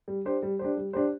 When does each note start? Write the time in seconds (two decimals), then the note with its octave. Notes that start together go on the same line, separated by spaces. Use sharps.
0.08 G3
0.25 D4 G4 C5
0.43 G3
0.59 D4 G4 C5
0.77 G3
0.93 D4 G4 C5